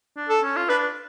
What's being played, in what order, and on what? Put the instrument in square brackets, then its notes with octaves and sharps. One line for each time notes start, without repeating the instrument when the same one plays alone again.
[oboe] D4
[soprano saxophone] A4
[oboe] C#4
F4
[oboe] D4 [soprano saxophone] B4